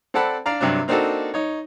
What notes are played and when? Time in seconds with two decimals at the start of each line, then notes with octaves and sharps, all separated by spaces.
0.14 C4 A4 D5 F#5 A5 B5
0.46 D4 D5 F5 A#5
0.61 G2 C3 F#3 D4
0.88 A#3 C4 D4 D#4 F#4 A4
1.34 D#4 C#5